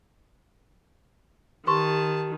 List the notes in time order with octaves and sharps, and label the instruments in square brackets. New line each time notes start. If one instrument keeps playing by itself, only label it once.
[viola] D#3 [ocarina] G4 [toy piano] B4 C6 C#6 [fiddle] A5